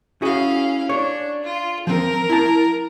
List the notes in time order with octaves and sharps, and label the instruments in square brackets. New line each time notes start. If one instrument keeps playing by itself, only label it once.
[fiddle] C#4 F5 [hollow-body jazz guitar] E4 F#4 G#4
[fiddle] D4 [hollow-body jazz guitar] C#5
[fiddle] F4
[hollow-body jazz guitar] F3 C4 [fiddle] A#4
[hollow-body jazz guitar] E4 A5